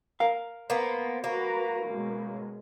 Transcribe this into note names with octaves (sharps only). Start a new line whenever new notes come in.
A#4 F5
A#3 B3 C5
A#3 F#4 B4 A#5
F#2 B2 G#3